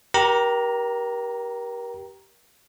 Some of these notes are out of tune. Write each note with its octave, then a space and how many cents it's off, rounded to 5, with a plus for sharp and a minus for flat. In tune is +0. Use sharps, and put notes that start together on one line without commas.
G4 -15 A#4 +35 A#5 +0